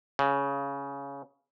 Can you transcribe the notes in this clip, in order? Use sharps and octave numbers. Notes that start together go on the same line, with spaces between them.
C#3